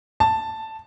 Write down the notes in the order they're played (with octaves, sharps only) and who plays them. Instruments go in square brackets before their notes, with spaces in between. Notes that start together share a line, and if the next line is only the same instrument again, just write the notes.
[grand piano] A5